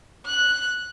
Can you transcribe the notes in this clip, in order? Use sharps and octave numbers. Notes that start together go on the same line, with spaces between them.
F#6